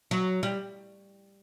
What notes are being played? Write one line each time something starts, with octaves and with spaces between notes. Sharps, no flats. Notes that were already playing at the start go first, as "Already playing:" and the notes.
F#3
G3